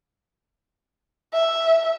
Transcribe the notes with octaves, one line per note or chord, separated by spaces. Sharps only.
E5